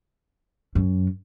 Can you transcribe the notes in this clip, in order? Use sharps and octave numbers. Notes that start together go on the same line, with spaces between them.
F#2